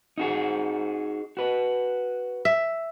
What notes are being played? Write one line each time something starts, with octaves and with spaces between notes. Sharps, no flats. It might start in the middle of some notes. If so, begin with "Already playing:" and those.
D#4 F#4 G#4
F#4 B4
E5